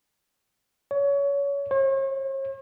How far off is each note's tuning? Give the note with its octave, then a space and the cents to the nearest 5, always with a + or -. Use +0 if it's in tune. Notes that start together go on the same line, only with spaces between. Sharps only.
C#5 +25
C#5 -45